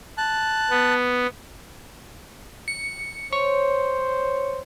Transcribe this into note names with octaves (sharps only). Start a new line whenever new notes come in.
A5 F#6
B3
C#7
C5 C#5